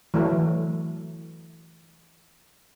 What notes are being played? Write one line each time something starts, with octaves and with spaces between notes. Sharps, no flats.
E3 F#3 A3